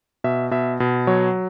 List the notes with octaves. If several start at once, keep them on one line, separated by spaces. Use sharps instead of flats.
B2 E5
B2 E5
B2
F#3 C#5